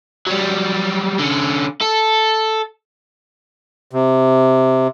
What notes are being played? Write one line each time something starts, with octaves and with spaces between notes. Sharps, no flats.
F#3 G3
D3 C#4
A4
C3